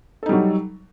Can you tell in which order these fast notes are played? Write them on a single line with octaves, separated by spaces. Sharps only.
A4 D#4 G3 F#3